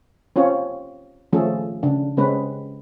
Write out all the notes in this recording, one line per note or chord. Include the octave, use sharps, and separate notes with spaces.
C4 C#4 F4 C#5
D#3 F3 A3 C#4 G#4 A4
C#3 D4
C#3 G#3 C4 C#4 B4